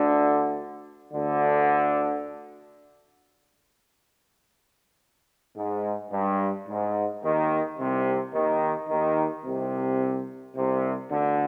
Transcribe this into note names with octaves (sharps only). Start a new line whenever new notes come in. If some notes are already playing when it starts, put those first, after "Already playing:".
Already playing: D2 D3
D2 D3
G#2
G2
G#2
D#2 D#3
C2 C3
D#2 D#3
D#2 D#3
C2 C3
C2 C3
D2 D3